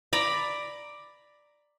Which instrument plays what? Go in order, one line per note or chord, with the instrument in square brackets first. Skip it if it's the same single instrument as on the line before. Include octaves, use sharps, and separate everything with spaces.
[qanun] D5 A#5 B5